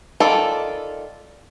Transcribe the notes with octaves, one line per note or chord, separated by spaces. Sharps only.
D#3 F4 A4 D5 B5